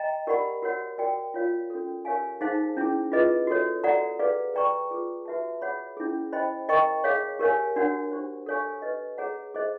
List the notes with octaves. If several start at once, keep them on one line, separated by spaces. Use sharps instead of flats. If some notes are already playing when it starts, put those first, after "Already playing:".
Already playing: D#5 G5 A#5
G4 A#4 D5 F#5 B5
F#4 A#4 C#5 F#5
F#4 A#4 D5 G5
F4 A#4 C#5 F5
C#4 F#4 A4
G4 A#4 C#5 F5 G#5
D#4 G#4 C5 F5 A5
C#4 E4 G#4
F4 G#4 B4 D#5
F#4 A4 C#5
F#4 A4 D5 F#5 A#5
G#4 B4 D5 F5
B4 D5 G5 A#5 C#6
F4 G#4 B4
F#4 B4 E5 A5
G#4 C#5 F#5 B5
C#4 E4 G#4
C5 D#5 G5 B5
A#4 D#5 G5 A#5 C#6
G#4 C#5 F5
G4 A#4 C#5 F5 G#5
D4 F#4 A#4 C#5 F#5
D4 G4 C5
A4 C#5 F5 G#5 C#6
G4 B4 D#5
G#4 C#5 F#5 A#5
G#4 C5 D#5